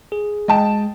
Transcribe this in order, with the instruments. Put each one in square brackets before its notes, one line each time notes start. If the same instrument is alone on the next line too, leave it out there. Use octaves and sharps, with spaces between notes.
[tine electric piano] G#4
[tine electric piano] G#3 [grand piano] D#5 G5 A5